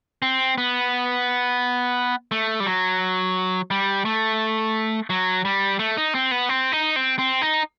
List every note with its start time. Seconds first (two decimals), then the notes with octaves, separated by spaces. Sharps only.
0.22 C4
0.58 B3
2.32 A3
2.60 G3
2.66 F#3
3.71 G3
4.05 A3
5.10 F#3
5.45 G3
5.79 A3
5.97 D#4
6.15 C4
6.31 B3
6.49 C4
6.72 D#4
6.96 C4
7.19 C4
7.42 D#4